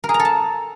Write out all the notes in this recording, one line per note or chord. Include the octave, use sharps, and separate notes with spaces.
A#4
G#4
A#5
A4
A5